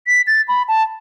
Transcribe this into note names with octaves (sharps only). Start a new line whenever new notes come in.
B6
A6
B5
A5